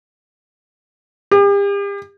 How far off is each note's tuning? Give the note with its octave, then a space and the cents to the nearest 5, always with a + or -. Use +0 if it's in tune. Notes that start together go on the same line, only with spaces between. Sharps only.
G4 +40